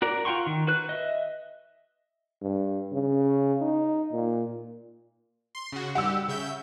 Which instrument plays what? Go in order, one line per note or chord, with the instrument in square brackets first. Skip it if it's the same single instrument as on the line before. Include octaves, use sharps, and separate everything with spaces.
[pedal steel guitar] F#4 A#4 D5
F4 F#5 G5 C6 C#6
D#3
F#4 B4 F#6
D#5 E5
[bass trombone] G2
C#3
D#4
A#2
[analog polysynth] C6
C#3 F#4
[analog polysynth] G3 G4 [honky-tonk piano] F#5 E6
[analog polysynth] C#3 E5 G6